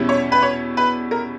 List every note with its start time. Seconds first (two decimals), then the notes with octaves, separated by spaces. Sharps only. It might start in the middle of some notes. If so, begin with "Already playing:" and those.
Already playing: E2 B2 G3 C#4 E4
0.09 C#5
0.32 B4
0.42 C#5
0.77 B4
1.11 A#4